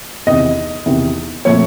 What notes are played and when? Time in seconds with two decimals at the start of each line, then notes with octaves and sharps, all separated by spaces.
0.26 E2 C3 D#3 D#5
0.86 E2 C3 D#3
1.45 A#2 F3 A3 C4 C#5